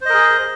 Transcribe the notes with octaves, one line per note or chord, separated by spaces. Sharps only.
G#4 A#4 C5 D#5